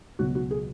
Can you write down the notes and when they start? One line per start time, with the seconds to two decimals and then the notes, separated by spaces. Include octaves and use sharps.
0.19 C#2 B2 F#3 F#4
0.35 F#4
0.51 G#4